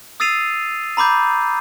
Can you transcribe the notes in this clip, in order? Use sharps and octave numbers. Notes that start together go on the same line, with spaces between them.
D#6 E6 A6 C7 D#7 F7
A#5 B5 D6 G6